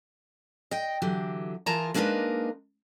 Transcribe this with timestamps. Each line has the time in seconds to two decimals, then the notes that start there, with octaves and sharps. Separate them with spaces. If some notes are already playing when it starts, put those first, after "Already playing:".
0.71 D#5 G5
1.02 D3 E3 F#3 G4
1.66 E3 F4 G#4 A#4 A5 A#5
1.94 G#3 A#3 D4 D#4 A#4 B4